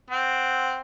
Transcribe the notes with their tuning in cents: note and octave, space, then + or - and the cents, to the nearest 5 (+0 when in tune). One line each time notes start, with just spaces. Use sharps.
C4 +0 F#5 +0